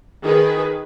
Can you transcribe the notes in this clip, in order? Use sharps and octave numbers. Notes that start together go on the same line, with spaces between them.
D#3 G#4 B4